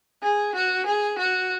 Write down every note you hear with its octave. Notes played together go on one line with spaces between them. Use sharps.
G#4
F#4
G#4
F#4